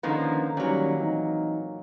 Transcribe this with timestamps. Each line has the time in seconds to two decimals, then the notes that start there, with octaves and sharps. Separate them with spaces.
0.03 D3 D#3 F3 A#3 C#4 B4
0.57 A#2 D#3 F#3 G3 C#4
1.00 E3 C4 D#4